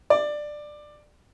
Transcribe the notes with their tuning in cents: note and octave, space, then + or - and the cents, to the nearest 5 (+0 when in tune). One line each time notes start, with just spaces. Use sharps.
D5 +15